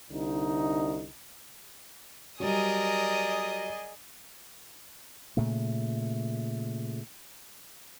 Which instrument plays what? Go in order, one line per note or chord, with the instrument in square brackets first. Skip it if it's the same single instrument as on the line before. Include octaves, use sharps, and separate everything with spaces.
[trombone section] C2 D3 D#4
[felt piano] F#3 G3 [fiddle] G#4 D#5 [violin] A#4 D#6 [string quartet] D5
[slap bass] A#2 C#3 A3